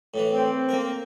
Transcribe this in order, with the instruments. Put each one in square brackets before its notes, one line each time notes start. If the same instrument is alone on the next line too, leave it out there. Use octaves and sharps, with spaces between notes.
[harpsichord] A2 E3
[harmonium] C4
[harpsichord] A#3 A#4